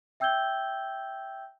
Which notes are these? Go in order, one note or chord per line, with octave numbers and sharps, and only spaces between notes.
E5 G5 E6 G6 G#6 G7